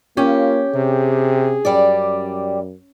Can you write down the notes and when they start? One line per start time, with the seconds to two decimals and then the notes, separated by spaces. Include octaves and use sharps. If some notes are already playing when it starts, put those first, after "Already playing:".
0.17 A#3 C#4 F4 G4
0.74 C3 G#4
1.65 F#2 G3 D5